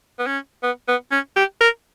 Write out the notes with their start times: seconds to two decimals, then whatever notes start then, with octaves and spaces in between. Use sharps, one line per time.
0.19 B3
0.27 C#4
0.63 B3
0.88 B3
1.12 C#4
1.36 G4
1.61 A#4